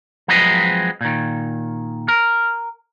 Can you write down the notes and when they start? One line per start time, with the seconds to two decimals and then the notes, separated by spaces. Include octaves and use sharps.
0.28 F3 F#3 G#3 C4 B4 D#5
1.01 A#2 D#3
2.08 A#4